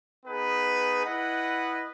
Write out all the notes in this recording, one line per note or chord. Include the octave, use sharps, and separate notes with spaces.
B3 D#4 G#4 B4
E4 B4 D#5 F#5